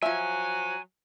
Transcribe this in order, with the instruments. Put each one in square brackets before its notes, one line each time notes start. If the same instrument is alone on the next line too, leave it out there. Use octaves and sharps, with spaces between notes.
[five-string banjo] F3 E5 [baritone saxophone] F#3 [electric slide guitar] G#5